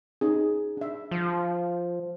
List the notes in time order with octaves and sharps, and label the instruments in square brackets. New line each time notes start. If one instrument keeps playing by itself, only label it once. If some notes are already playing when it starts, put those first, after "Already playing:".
[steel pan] C#4 D#4 G#4
D4 E5
[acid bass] F3